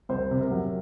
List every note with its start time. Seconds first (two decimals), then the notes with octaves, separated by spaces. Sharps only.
0.09 C2 C5
0.31 C3
0.41 A#4
0.51 F#3